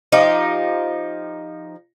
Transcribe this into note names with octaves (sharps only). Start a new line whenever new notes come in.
F3 D#4 G4